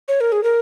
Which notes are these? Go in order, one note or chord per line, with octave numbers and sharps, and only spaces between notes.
C#5
A#4
G#4
A#4